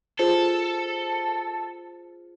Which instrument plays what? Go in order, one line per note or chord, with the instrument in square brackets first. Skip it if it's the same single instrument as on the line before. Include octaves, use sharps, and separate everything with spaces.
[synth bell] F4 G#4 C5 [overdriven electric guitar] A4